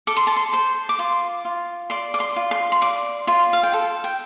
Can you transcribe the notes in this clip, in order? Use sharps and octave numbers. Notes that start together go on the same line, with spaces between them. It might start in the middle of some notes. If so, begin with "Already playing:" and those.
A4 D6
C6
A5
C6
C5 C6
D6
F4 C6
F4
D5 C6
D6
C6
F4
C6
C6
D5 D6
F4 C6
F5
G5
A4 A5
G5